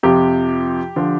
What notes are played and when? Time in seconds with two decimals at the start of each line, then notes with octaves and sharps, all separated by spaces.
0.03 F2 C3 F3 G4
0.96 D3 F3